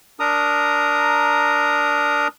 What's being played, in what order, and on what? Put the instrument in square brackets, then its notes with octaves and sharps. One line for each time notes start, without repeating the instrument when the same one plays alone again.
[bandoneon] D4 A#4 A#5 D#6